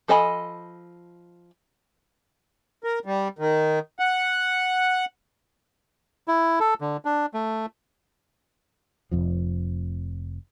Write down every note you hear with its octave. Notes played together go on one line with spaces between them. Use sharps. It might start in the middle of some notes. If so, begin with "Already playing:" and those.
F3 A4 D#5 G#5 B5
A#4
G3
D#3
F#5
E4
A4
D3
D4
A3
F1 C2 F2 F3